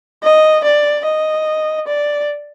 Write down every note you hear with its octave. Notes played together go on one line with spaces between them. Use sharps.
D#5
D5
D#5
D5